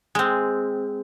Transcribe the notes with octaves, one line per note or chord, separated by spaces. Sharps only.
G#3 C4